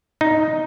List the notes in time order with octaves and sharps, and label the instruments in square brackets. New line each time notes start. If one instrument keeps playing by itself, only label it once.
[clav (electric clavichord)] D#4